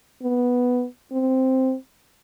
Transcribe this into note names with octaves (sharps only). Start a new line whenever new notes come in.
B3
C4